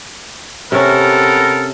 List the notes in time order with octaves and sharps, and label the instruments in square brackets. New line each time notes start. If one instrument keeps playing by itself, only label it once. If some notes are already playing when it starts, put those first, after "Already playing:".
[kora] C3 C#4 [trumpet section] B3 A4 A#4